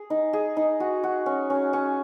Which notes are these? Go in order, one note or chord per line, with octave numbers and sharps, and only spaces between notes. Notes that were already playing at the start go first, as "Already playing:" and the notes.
Already playing: G#4
D#4
G#4
D#4
F#4
F#4
C#4
C#4
C#4